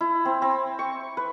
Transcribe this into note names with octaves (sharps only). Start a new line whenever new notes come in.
E4
C4
C4
C#6
B4